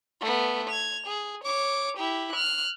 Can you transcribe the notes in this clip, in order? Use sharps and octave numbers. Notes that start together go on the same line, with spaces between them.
A3 B3
G#6 F7
G#4
C#5 D6
E4 G4
F6 F#6